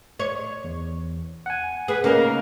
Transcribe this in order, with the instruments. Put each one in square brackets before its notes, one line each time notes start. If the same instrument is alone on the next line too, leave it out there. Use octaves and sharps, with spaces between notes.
[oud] C#5
[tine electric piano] E2
F#5 G#5
[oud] G#4 [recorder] B4
[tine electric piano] C#3 [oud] A#3 D#4 [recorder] A#4